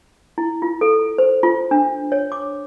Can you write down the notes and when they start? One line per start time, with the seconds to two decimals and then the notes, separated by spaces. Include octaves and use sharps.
0.38 E4
0.62 F4
0.81 A4
1.18 C5
1.43 F4
1.71 D4
2.12 C#5
2.32 D6